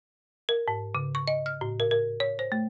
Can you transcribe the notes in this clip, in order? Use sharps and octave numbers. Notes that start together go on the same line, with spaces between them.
A#4
G#2
C#3
C#6
D#5
F6
A2
A#4
A#4
C#5
C5
A3